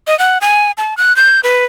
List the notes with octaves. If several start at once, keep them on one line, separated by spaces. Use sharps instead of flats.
D#5
F#5
G#5
A5
F#6
G6
B4